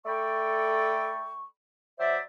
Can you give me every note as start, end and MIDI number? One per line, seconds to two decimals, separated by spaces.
0.06 1.44 57
0.06 1.44 69
0.06 1.44 74
0.06 1.44 79
0.06 1.44 83
0.06 1.44 85
1.99 2.18 54
1.99 2.18 72
1.99 2.18 74
1.99 2.18 76